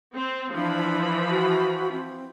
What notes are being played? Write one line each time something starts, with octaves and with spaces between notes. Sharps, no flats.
C4
E3 F3 D4 B5
F#4
C4